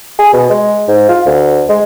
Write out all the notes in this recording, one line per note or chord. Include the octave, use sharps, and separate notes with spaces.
G#4
B2
G#3
G#2
F4
D2
G#3